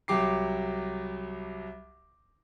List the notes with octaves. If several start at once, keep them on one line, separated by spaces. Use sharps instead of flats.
C2 F#3 G4 D6 C7